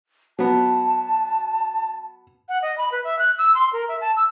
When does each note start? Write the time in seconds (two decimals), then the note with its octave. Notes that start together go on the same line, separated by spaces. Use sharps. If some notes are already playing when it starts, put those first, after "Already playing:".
0.39 F#3 B3 A5
2.49 F#5
2.62 D#5
2.78 B5
2.92 B4
3.04 E5
3.19 F#6
3.38 E6
3.55 C6
3.73 A#4
3.89 E5
4.01 A5
4.16 E6